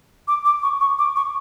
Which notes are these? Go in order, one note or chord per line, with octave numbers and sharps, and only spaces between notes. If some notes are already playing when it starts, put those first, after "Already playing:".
D6
D6
C#6
C#6
D6
C#6